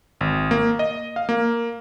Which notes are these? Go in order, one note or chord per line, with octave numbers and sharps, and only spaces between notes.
G#1
A#3
D#5
F5
A#3